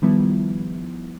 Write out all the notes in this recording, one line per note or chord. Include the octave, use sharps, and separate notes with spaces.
D#3 F3 G3 B3 E4